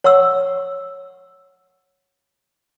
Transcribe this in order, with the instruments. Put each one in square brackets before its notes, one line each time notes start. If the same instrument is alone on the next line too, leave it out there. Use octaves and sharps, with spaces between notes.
[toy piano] C#5 F#5 C#6 E6